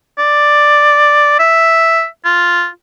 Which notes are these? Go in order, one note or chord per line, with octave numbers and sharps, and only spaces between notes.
D5
E5
F4